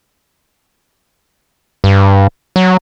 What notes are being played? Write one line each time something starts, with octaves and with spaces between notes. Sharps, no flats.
G2
F#3